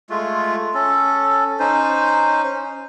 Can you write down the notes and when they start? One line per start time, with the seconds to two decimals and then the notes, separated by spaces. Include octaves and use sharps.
0.10 G#3 A3 F4
0.74 C#4 A4
1.59 C#4 D#4 C5